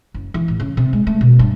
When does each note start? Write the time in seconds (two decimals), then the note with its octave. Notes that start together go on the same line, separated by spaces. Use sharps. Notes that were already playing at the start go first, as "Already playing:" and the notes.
0.14 F#1
0.34 E3
0.48 A1
0.60 C#3
0.77 C3
0.93 G#3
1.07 A3
1.21 B2
1.39 G2